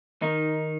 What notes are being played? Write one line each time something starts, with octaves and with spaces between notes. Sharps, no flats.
D#3 D#4